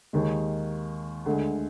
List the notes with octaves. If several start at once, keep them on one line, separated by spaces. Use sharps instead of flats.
D#2 D#3 G#3
D2 D3 G#3